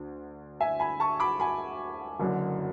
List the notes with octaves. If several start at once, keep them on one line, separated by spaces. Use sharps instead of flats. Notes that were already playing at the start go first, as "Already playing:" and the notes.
Already playing: D2 D3
E5 G#5
G#5 B5
A5 C#6
B5 D6
G#5 B5
F#1 F#2 D3 F#3